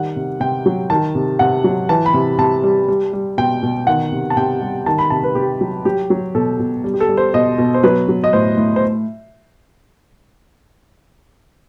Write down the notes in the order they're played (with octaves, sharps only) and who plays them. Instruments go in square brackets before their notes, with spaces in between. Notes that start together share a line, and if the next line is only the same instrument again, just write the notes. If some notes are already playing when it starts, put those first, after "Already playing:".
Already playing: [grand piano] D#3 G3 F#5
C3
C3 G5
F#3
D#3 A5
C3
C3 F#5
F#3
E3 A5
B5
C3
C3 A5
G3
G3
G3
B2 G5
B2
D#3 F#5
C3
A5
C3 G5
G3
D#3 A5
B5
C3 A5
B4
C3 G4
F#3
F#3 G4
F#3
B2 A4
B2
G3
G4
A4
G3
C5
B2 D#5
B2
C5
F#3 B4
F#3
D#5
A2 C5
A2
C5